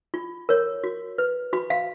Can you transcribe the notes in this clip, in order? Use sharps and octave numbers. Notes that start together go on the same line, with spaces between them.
F4
A#4 C#5
F#4
B4
F#4 B5
F5